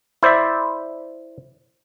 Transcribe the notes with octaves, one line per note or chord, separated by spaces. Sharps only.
E4 C5 D5 E5